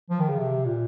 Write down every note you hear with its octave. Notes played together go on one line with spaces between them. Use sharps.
F3
D#3
C#3
C3
A#2